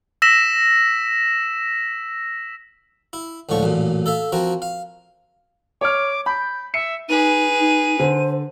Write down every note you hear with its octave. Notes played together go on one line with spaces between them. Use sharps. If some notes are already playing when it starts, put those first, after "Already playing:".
E6 A#6 B6 E7
E4
C#2 A2 D3 F3 C#6
A1 F#2 A#2
A4 E5 F5
F3 C4 F#4 A#4
F5
C#5 D6 F6
B5 G6
E5 C#7
D#4 G#4 B4 D#7
D#4
D3 C5